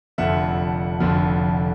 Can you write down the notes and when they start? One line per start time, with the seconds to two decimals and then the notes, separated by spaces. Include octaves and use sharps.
0.18 F1 F2 D3 F3 E5 F#5
1.00 F1 F2 D3 F3